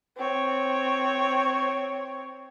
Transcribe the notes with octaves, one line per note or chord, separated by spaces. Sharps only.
C4 C#5